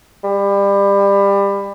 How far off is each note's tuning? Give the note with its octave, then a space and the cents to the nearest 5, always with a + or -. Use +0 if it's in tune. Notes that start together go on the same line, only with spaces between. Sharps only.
G3 +25